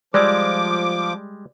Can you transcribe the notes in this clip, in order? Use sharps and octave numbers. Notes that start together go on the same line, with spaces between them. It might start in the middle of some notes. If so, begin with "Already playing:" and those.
F3 G3 G#3 D5 D6 E6